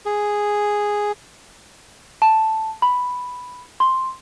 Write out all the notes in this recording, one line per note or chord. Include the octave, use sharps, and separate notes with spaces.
G#4
A5
B5
C6